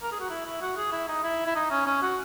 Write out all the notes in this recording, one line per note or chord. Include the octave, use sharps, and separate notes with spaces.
A#4
G#4
F#4
E4
E4
F#4
G#4
E4
D#4
E4
E4
D#4
C#4
C#4
F#4